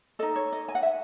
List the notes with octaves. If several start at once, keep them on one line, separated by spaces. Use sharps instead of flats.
D#4 A4 D#5
C#5
D#5
G#5
F#5
E5